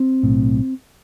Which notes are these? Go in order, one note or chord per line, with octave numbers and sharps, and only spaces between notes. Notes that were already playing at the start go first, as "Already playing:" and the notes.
Already playing: C4
B1 A2